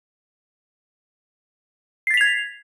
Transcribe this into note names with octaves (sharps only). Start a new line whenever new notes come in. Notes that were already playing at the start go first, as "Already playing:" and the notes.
G#6 A6 B6 C7 F7